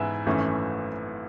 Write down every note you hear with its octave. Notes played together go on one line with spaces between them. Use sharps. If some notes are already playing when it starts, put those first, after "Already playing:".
Already playing: G#2 E3 B3 E4 E5 G#5
G#1 F#2 E3 A3 C#4